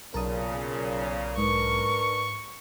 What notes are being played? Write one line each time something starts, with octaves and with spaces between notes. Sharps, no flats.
B1 A#2 C#3 A#4 A5 D#6
G#2 D4 A#4 B4 C#6